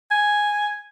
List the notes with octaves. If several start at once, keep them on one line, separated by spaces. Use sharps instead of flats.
G#5